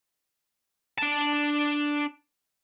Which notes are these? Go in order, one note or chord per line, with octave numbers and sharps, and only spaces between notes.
D4 A5